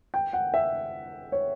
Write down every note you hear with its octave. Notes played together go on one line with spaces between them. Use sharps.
G5
F#5
E5
C#5